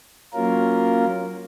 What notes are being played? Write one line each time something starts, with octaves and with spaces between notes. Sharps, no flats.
F#3 A#3 C#4 F4 A#4